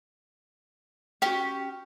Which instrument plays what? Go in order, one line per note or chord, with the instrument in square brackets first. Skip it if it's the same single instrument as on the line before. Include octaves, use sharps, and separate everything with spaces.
[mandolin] C#4 G4 [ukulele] F#4 G5